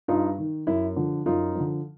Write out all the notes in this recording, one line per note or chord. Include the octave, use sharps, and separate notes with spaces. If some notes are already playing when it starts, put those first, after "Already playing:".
G2 D#4 F4
D#3
F#2 E4
D3 F3
F#2 D#4 F4
D3 F3